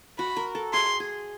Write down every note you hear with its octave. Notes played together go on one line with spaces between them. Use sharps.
F#4 B5
A#4
A4
G#4 C6
G#4